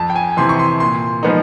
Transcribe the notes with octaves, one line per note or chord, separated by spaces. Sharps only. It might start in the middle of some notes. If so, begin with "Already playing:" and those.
Already playing: F2 A5
G5
G#5
C3 E3 C6
C#6
C6
A#2 C6
F3 G#3 B3 D#4